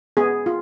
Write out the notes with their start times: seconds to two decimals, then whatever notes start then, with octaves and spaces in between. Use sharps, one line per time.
0.17 B3 G#4
0.46 F4